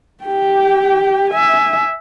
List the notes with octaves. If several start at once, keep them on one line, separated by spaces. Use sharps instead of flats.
G4 G5
E5 G#5